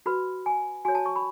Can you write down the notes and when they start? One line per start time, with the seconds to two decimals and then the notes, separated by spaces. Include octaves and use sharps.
0.06 F#4 B4 B5
0.46 G#5
0.85 F#4 C#5 G#5
0.95 A5
1.06 C#6
1.16 B5